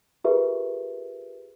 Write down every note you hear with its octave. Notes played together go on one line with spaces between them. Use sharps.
F4 G4 G#4 A#4 B4 E5